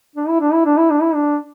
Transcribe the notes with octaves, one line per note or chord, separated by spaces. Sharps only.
D4
E4
D4
E4
D4
E4
D4
E4
D4